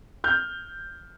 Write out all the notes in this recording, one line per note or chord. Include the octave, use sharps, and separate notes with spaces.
F6 G6